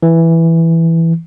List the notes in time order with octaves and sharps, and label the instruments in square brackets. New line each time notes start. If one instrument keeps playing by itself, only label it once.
[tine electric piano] E3